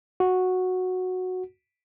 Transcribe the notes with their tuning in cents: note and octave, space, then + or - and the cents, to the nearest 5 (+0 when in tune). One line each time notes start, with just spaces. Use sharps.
F#4 -5